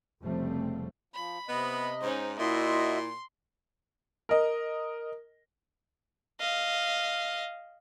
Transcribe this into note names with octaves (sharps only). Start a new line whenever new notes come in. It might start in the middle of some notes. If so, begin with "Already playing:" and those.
F1 C#3 F3 G3 A3 C4
F3 B5
C3 B3 D#5
G#2 C#4 D#4 C5
A#2 E4 F#4 D#5 E5 C6
A#4 D#5
D#5 F5